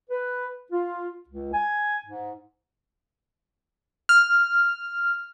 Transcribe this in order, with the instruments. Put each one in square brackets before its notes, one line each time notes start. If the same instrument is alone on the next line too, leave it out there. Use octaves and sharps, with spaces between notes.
[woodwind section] B4
F4
C#2
G#5
G#2
[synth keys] F6